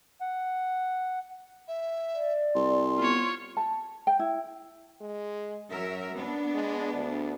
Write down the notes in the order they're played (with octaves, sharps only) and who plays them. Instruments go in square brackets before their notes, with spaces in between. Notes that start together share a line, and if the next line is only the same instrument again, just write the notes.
[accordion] F#5
[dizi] E5
[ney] D5
[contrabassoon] C2 [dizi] C6
[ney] B3 [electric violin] F4 C#5
[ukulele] A5
G5
E4
[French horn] G#3
[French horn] F#2 [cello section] F#3 A#4 E5
[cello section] B3 D4
[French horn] G#3
D2